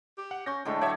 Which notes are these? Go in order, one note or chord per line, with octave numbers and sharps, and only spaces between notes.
G4
F#5
C#4 C#6 G6 A#6
A2 D3 G#3 A3
F#3 A4 C#5 D5 E5 F#5